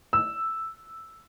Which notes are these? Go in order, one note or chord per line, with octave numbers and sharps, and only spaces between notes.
E6